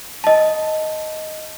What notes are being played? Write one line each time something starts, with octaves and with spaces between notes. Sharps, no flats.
D#5 A5